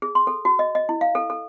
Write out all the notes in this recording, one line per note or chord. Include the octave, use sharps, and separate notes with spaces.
G#4
C6
A4
F#4
D#5
D#5
E4
F5
A4
A4